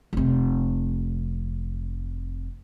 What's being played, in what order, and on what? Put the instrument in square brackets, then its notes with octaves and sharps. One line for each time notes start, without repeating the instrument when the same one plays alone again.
[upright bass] F1 C3